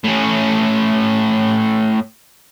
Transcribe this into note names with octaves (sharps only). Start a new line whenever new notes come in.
A2 C#4